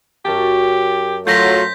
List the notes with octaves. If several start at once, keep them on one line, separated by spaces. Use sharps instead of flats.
F#2 G4 A#4 A5
F#3 A3 F4 C5 G6 A#6 B6